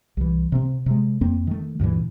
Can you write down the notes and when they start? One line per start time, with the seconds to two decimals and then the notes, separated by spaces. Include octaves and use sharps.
0.17 C2 E3
0.52 C3 C4
0.86 C3 G#3
1.21 F2 A#3 C4
1.47 D#3 A3
1.80 D2 G2 A#2 E3